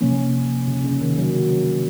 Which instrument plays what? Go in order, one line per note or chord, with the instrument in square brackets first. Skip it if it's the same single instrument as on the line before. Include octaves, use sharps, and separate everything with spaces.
[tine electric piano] C3 F3 A#3 [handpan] C#4
[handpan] C#3
C#3
D#3
F#3